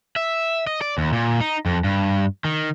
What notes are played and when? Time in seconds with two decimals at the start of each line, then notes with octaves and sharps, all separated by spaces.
0.16 E5
0.67 D#5
0.81 D5
0.98 D#2
1.13 A#2
1.40 D#4
1.66 F2
1.84 G2
2.45 D#3